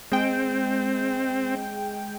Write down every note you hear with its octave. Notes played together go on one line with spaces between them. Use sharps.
G#3 C4 G5